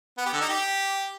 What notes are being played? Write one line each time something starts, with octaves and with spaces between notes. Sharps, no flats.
B3
G4
D3
D#4
G4